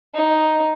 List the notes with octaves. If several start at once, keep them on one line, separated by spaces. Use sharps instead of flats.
D#4